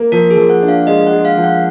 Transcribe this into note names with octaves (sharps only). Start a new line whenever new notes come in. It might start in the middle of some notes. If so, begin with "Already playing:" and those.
Already playing: A#3
F3 A#4
G#4
F3
F#5
D4
F5
G#3 D#5
F#5
G#3
F5
F3
F#5